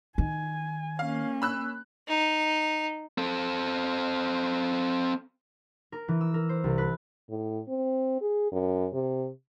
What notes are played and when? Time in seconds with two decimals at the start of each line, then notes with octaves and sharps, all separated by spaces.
0.18 D#3 G#5
0.99 A#3 C#4 F5
1.42 B5 E6 F#6
2.08 D#4
3.18 C4 A4
5.92 A#4
6.08 E3
6.21 E6
6.34 A#4
6.49 C5
6.64 C2
6.78 B4
7.30 A2
7.69 C4
8.21 G#4
8.52 F#2
8.93 C3